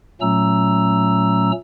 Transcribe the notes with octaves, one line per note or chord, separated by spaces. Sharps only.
A#2 F#3 A3 C#4 A#5 E6